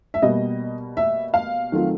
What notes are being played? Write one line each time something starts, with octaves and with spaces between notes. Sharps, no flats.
E5
B2 G3 A#3 D#5
E5
F5
D#3 F#3 A3 C4 F4